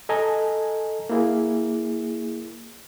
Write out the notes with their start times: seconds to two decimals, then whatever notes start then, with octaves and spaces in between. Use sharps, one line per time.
0.09 A4 D#5 G#5 A#5
1.10 A#3 E4 G#4